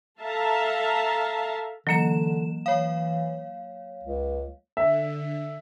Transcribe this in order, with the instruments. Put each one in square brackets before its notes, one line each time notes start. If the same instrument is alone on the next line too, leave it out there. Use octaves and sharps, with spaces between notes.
[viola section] A4 E5 F5 A5 A#5
[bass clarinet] D3 [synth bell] E3 E7 [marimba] F#3 A#3
[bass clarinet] E3 [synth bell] C#5 F5
[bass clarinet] C#2
[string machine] D3 [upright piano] E5